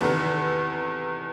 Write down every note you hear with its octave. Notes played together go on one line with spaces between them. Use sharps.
E2 C3 D#3 A4 B4